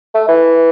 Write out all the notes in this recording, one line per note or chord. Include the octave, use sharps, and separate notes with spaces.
A3
E3